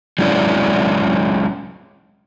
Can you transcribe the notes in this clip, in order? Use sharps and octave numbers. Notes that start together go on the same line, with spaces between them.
F#3 G#3 C#4 E4 D5